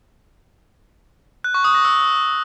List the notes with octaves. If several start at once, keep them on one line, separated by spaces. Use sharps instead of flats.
F#6
C#6
D#6
A#6
E6